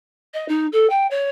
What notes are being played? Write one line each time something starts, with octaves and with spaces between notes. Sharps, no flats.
D#5
D#4
A4
G5
C#5